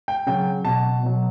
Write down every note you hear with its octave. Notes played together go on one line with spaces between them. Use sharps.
G5
C#3 F#3 G5
B2 F#3 A5
B2 F#3